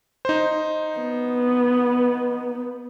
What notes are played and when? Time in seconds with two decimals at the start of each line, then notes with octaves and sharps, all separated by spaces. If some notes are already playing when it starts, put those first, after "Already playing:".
0.25 D#4 C5
0.99 B3